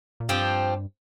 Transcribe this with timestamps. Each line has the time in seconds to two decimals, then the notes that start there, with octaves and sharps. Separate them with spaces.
0.20 A#2
0.29 G2 F3 C4 G4